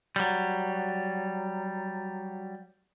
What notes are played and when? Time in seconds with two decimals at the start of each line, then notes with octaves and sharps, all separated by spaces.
0.16 F#3 G3